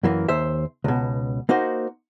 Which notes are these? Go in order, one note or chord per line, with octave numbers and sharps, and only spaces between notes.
F#2 E3 A#3
D#2 C5 E5
C#2 B2
A#3 D#4 F#4 C5